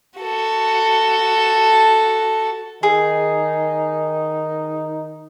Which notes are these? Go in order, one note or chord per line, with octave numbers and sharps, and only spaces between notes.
F#4 A4
D#3 D#4 G#4